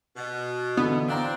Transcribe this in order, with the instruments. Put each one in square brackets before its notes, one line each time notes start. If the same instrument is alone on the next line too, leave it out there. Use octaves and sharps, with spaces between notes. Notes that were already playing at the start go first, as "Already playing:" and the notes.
[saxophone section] B2
[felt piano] D3 E3 [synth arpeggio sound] B3
[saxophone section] C4 D4 [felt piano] F5 A#5